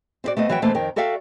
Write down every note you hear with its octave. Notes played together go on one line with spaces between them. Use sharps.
C4 E4 F#4 D5
A3 B3 C4 D#5
E3 F#3 F#4 E5 G5
B2 E3 A3 A#3 C4
F2 D#3 A#4 G5
F#4 A4 D5 E5 F5 G5